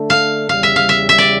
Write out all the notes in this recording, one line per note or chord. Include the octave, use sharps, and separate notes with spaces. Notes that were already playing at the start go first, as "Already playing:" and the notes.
Already playing: D3 A3 D4 A4
F5
E2 C#3 G3 F5
E5
F5
E5
E5
D5